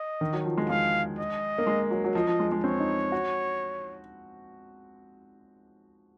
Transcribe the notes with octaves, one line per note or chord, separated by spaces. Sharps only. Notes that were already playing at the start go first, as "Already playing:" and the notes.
Already playing: D#5
D#3
F#3
F3
G#3
G#3 F5
D#5
A#3
G#3
F#3
F#3
F3 D#5
F3
G#3
G#3
C4 C#5
D#4
F#4